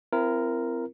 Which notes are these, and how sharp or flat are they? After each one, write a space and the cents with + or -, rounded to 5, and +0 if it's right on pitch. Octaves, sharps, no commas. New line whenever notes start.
C4 -15 E4 +40 A#4 +0